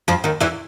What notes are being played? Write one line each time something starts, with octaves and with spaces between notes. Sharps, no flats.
F2 F3
D#2 D#3
E2 E3